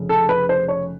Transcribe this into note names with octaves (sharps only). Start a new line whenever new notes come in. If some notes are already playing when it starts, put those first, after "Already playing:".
Already playing: F1 C#3
A4
B4
C5
C#5